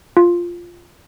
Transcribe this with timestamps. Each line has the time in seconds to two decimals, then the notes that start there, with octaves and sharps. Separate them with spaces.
0.17 F4